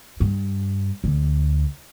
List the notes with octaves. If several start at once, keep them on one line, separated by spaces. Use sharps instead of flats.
G2
D2